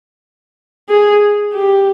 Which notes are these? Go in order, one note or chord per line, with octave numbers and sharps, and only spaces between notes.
G#4
G4